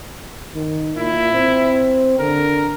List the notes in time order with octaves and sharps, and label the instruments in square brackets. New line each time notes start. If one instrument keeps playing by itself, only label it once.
[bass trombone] D#3
[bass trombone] A#2 [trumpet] E4
[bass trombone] C4
[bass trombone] D3 [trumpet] A#4